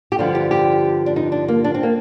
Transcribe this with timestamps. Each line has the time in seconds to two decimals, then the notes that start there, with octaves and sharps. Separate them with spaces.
0.12 G4
0.18 G2 D3 F3 F4
0.35 G4
0.51 G4
1.06 D4
1.16 D#4
1.32 D4
1.48 A#3
1.64 D4
1.74 C4
1.83 A#3